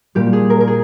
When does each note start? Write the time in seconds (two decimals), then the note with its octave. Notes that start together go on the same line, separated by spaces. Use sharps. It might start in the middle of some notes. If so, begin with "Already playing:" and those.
0.15 A#2 G3 G4
0.33 G#4
0.50 A#4
0.60 A#4
0.67 G#4